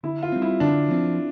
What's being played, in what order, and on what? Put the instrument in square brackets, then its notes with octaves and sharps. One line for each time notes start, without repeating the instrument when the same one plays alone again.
[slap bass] D3 [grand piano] E4
[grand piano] F4
[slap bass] G3 C4
[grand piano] E4
[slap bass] D3 [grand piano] D4
[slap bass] F3 C4